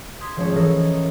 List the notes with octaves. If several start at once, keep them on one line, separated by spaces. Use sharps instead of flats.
C6 D#6 G#6 B6
G#1 F3 G#3 A3 C#4 A5
E3 A4 A#4 A#5 D#6 A#6